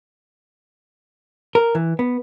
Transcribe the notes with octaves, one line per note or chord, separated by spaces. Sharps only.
A#4
E3
B3